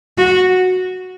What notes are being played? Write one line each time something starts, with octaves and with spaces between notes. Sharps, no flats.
F#4